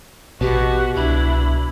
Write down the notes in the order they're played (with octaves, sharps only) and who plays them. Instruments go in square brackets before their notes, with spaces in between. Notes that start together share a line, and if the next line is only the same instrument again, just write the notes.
[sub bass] A1 [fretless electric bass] B2 [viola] F#4 [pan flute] G4
[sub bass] C2 [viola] D4 E4 [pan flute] B5